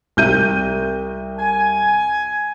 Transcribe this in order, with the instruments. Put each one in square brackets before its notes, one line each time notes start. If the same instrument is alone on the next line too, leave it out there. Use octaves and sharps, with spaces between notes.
[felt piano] C2 G6 D#7
[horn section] G#5